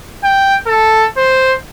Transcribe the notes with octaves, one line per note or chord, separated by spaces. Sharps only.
G5
A4
C5